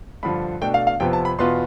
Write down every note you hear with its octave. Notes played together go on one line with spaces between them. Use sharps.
G2 D3 F3 B5
B2 A3 D4 G5
F5
F5
F2 C3 F3 B3 G5
A5
B5
E2 B2 B3 F4 C6